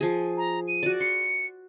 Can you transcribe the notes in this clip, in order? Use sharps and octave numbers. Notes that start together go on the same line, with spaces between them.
F3 G#4
A#5
D#7
F#4 D5
C6 C#7